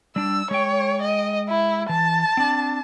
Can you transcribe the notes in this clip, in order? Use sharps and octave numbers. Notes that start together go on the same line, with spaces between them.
G3 D4 D5 E6
G#3 C#5 G5
D#5
E4
E3 A5
C4 D4